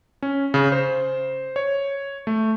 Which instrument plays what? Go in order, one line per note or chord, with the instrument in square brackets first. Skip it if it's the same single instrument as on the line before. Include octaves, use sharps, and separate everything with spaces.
[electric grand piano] C#4
C#3
C5
C#5
A3